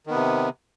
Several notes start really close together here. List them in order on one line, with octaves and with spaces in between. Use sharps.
D#3 B3 C3